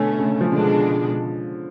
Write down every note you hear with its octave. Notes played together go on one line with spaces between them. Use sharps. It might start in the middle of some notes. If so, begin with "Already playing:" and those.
Already playing: B2 D3 A3 C#4
C#3
F3
B2 D3 G#3 D4